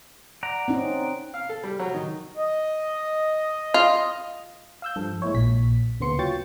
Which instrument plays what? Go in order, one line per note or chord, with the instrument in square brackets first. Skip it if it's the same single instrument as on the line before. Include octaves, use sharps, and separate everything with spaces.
[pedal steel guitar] D5 F#5 A#5
[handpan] C4 C#4 D#4
[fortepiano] F5
A4
G3
F#3
D#3
[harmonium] D#5
[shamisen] F4
[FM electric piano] F5 E6 G6
G2 F3 A4
G#3 A#3 E4 C#5
A#1 A#2 B6
D2 C#3 A#3 B3 C6 C#7
F#3 F4 G5 C#6 A6